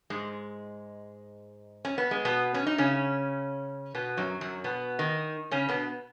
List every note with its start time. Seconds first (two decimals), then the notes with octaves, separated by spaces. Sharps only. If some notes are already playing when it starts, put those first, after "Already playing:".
0.10 G#2 G#3
1.85 C#4
1.98 B3
2.11 G#3
2.25 B2 B3
2.54 C#4
2.67 D#4
2.78 C#3 C#4
3.95 B2 B3
4.17 F#2 F#3
4.41 F#2 F#3
4.64 B2 B3
4.99 D#3 D#4
5.51 C#3 C#4
5.69 B2 B3